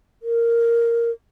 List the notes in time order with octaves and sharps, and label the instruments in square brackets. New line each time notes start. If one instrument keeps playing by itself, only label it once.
[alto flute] A#4